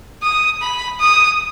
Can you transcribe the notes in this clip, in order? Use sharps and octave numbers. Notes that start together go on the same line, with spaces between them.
D#6
B5
D#6